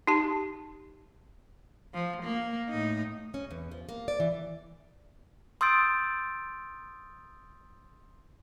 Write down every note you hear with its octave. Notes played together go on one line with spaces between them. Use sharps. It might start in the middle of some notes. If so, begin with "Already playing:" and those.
D#4 G4 A5
F3
A#3
A2 D#4
C#4
E2
F3
A#3
D5
E3
C6 D#6 E6 G6 A6 D7